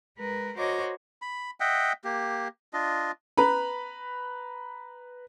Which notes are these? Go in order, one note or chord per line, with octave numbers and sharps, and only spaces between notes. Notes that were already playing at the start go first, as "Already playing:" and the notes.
G#3 A#4 B4
F#4 A#4 C5 C#5 D#5 D6
B5
D#5 E5 F#5 G5
A#3 G4
D4 F4 D#5
B4 A#5 B5